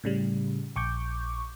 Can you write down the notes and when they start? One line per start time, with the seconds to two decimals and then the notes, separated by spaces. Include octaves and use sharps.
0.04 A2 C#3 G3
0.76 A#1 C#6 D6 G6